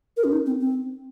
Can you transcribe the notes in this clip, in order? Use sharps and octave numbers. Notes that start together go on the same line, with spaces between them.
A#4
C#4
D#4
C4
C4